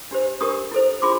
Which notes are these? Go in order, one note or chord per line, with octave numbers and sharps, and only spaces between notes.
D4 G4 C5
D4 G4 A#4 C#6 D#6
E4 A4 C5
D4 F4 G#4 C6 D6